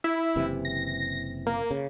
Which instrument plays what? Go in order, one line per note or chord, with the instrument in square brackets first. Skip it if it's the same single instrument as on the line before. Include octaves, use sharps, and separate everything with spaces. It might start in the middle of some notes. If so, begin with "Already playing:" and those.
[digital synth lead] E4
[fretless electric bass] F#1 C3 E3
[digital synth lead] A#6
A#3
[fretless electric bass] C#3